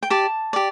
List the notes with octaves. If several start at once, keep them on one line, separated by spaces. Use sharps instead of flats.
G5
G4 D5 A5
G4 D5